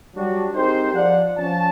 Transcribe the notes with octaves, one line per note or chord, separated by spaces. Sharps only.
F#3 G3 D4 F#4
C4 D#4 G4 G#4 A#4 C5
F3 D5 F#5
F3 C#4 A5